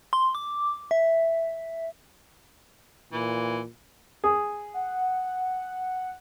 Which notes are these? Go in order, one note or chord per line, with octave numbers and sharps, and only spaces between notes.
C6
D6
E5
A#2 E3
G#4
F#5